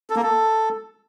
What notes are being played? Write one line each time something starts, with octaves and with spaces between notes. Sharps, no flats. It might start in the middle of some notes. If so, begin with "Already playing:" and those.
A4
A#3
A4